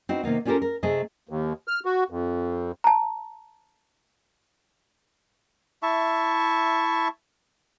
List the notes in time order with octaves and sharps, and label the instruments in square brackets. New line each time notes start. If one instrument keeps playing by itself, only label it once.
[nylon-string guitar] C4 D#4 E4 F#4 B4
C3 D#3 A#3 B3
B3 C#4 F4 G4 A4 A#4
A#4
C3 A3 G#4 D#5
[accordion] D#2
F6
F#4
F2
[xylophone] A5 A#5
[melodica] E4 E5 A5 C#6